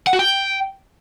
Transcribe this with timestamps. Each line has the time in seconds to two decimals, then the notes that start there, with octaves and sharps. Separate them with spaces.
0.07 F#5
0.13 F#4
0.19 G5